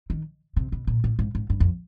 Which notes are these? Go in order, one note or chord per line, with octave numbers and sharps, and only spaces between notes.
D#3
C3
B2
A#2
A2
G#2
G#2
G2
F2